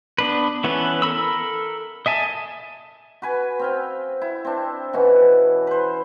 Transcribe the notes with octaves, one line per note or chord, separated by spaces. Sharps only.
B3 D4 B4
E3 B3 C#4 A4 B4
A4 A#4 B5 E6
D#5 E5 G#5 A5
F#4 B4 G#5
C4 F5 G5
E4
C4 D4
B2 E3 C#4 F#4
B4 C5